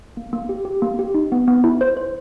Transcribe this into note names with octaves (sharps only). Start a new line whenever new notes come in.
A#3
A#3
G4
G4
A#3
G4
D#4
B3
B3
E4
C5
C5